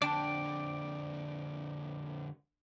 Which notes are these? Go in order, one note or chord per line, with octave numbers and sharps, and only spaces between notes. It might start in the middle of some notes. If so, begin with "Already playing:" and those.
F2 D3 D4 D5 G5 D6